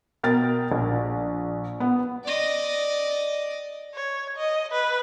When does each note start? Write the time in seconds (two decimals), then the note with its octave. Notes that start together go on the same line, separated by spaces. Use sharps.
0.23 B2 A#4 G5 A6
0.72 A#1
1.80 B3
2.24 D5 D#5
3.94 C#5
4.36 D#5
4.72 B4